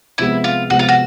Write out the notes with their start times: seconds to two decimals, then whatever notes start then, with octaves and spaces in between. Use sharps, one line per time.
0.18 C3 F3 G#3 B3 E4
0.44 F4
0.70 C3 F3 G#3 B3 F#4
0.79 F4
0.89 F#4